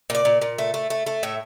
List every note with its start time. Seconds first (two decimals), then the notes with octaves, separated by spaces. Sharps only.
0.10 A#2 D5
0.25 A#2
0.42 A#2
0.58 A3
0.74 A3
0.90 A3
1.06 A3
1.23 A2 E5